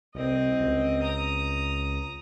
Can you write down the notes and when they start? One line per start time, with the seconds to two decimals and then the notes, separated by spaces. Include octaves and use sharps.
0.15 C2 C4 D#5
0.60 C#2
1.03 A#5 D#6